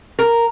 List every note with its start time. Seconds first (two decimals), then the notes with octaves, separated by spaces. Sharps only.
0.19 A#4